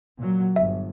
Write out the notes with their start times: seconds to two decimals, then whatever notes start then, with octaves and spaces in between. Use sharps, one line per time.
0.18 A#2 F#3
0.56 G1 E5